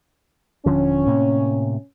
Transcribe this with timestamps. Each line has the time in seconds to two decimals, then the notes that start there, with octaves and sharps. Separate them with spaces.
0.66 D#1 D3 F3 C#4
1.07 A2 C3 A#3